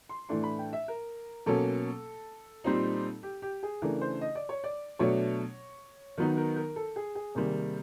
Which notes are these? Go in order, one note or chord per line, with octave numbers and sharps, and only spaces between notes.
C6
A2 E3 A3 D4 C6
B5
G5
E5
A#4
B2 F#3 A#3 C#4 A4
A#2 G3 C4 D#4
G4
G4
G#4
C#3 E3 A3 D4 A#4
C5
D#5
D5
C#5
D5
B2 F#3 A3 D4 C#5
D#3 F#3 B3 D#4
A#4
A#4
A4
G#4
G#4
C3 D#3 G3 A#3